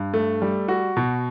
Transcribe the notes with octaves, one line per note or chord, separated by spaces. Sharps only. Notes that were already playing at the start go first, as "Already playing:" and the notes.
Already playing: G2
A3
G3
F#4
B2